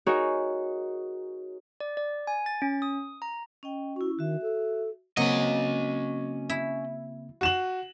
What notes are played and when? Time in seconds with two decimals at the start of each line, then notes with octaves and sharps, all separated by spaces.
0.06 D#4 F#4 G#4 A#4 C#5
1.80 D5
1.97 D5
2.27 G#5
2.46 A6
2.62 C#4
2.82 D#6
3.22 A#5
3.63 C#4 D#5 G5
3.96 C#4 E4 F#4
4.19 D#3 F#4 E5
4.42 A4
5.17 C#3 F#3 A#3 C4 C#4 D#5
6.50 E4
7.41 F#4 E7 F#7